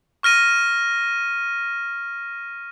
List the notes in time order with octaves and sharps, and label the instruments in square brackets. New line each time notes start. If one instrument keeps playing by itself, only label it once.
[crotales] C#6 F6 A#6 D#7